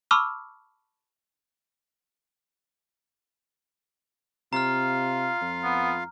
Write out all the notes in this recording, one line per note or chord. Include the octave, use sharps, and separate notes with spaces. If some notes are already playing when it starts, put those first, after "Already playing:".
A5 B5 C#6 D6 E6 F6
C3 F4 F5 A#5 F6
F2
B3